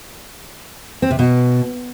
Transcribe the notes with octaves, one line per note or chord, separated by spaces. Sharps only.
C4
C3
B2